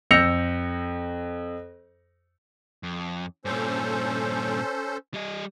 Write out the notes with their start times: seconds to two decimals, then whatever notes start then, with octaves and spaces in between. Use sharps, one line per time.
0.11 F2 E6 G6 A#6 C#7 F7
2.83 F2
3.45 G2 A#2 C#4 A4 C5
5.14 G3 D#5